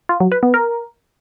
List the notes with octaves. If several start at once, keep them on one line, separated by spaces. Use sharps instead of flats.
F4
F#3
B4
B3
A#4